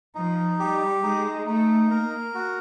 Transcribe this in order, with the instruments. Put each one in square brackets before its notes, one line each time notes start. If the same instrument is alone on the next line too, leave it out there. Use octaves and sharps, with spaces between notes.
[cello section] F3 [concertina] D#4
[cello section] G3 [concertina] G4
[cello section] G#3 [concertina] D#4
[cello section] A3 [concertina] D#4
[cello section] A#3 [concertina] A#4
[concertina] F#4